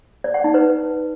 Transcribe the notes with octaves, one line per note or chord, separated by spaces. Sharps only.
D5
F#5
D#4
B4